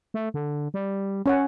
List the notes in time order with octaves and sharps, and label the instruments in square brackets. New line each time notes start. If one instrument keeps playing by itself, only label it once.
[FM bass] A3
D3
G3
[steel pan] C#4 C#5 F#5